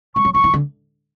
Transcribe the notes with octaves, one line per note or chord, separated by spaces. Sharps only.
G3 C#6
F#3
F3 C#6
E3
D3